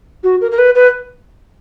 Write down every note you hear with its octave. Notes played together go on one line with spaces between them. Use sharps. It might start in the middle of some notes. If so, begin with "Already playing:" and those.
F#4
A#4
A#4
B4
B4